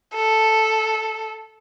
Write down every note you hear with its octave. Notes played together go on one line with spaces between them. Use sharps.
A4